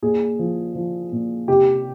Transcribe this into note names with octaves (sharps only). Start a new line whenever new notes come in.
A#2 G#4
F3
F3
A#2
C3 G4